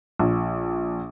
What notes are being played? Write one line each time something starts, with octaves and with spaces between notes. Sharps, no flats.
A#1